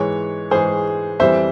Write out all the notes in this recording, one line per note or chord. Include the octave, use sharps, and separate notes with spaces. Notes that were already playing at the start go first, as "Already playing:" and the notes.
Already playing: G#2 E3 G#3 C#5
G#2 E3 G#3 G#4 C5
F2 E3 G3 C5 E5